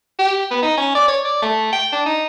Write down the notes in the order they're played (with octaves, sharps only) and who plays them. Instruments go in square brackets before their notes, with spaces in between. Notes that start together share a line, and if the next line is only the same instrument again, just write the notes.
[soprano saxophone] G4
B3
D#4
C#4
D5
C#5
D5
A3
G5
D4
D#4